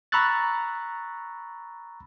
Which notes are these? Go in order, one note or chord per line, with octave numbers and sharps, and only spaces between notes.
A#5 B5 C#6 E6 F#6 A6